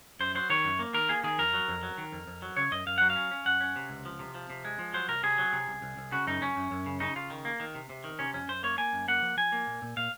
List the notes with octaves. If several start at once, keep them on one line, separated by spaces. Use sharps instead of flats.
F#2 C5
F#3 C5
D#3 C#5
F#2
A#3
D#3 A#4
A#3 G#4
D#3 G#4
F2 A#4
F#3
F2
F#3
D#3
F2
F2
F#3
C#3 C#5
F#2 D#5
F#2 F5
F#3 F#5
F5
C#4
C#4
F#2 F#5
C#4
C3
C#2
F3
C3
F3
C3
G#3
F3
F#3 C5
C2 A#4
C3 G#4
F#3
C3
C2
C2
C2
C#3 F#4
F#2 D#4
F#2 C#4
F#2
F#2
C#3
C#3 D#4
C#3 F4
D#3
A#3
D#3
C3
C3
D#3
C3 C#4
F2 C#4
F#2 C5
A#3 C#5
A#3 G#5
F#2
A#3 F#5
F3
F3 G#5
A#3
A#2
A#2
A#2 F5